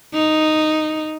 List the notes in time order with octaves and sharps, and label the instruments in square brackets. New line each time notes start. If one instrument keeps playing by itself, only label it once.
[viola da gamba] D#4